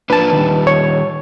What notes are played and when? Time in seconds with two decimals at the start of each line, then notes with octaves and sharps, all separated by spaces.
0.10 A#3 D4 F4 B4 A5
0.32 D#3 G3
0.67 C#5